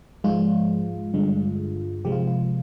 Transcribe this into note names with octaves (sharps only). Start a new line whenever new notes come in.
G#2 F3 G#3 F4
G2 D3 G#3
C3 F3 G#3 G4
F4
F4